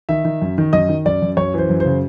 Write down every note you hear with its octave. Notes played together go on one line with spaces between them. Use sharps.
D#3 E5
D#3
F#2
D#3
F#2 D#5
D#3
F#2 D5
F#2
F#2 C#5
E3 C5
F#2
C5
C#3